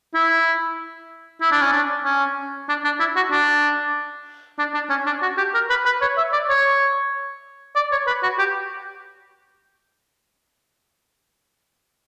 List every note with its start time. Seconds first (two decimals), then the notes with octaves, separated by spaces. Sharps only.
0.14 E4
1.42 E4
1.51 D4
1.62 C#4
1.72 D4
2.04 C#4
2.69 D4
2.84 D4
2.99 E4
3.16 F#4
3.31 D4
4.58 D4
4.74 D4
4.90 C#4
5.06 D4
5.22 F#4
5.37 G4
5.54 A#4
5.70 B4
5.86 B4
6.01 C#5
6.17 E5
6.33 D5
6.49 C#5
7.76 D5
7.92 C#5
8.07 B4
8.23 F#4
8.39 G4